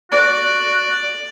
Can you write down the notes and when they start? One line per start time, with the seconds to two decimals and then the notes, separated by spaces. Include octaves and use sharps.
0.12 F#4 D5